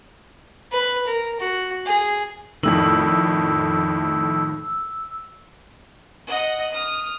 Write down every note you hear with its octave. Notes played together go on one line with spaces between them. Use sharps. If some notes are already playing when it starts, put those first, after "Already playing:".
B4
A#4
F#4
G#4
F2 A2 D#3 A3 D4 E6 F#7
D#5 F#5
D#6 F6